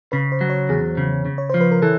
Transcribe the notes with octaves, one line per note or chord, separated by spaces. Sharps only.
C#3 B4
C5
F#3
C#5
E2 G#4
C#3
C#3
C#5
F3 C5
B4
A#4
E3 A4